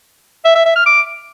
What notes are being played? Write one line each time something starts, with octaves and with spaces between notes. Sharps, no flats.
E5
E5
E5
F6
D6